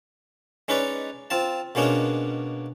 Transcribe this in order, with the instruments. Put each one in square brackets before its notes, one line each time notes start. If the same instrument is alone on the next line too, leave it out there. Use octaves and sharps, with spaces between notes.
[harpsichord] G#3 C#4 D#4 B4 C#5 D5
C4 F4 A5
B2 G#3 A#3 C#4 D4 G#4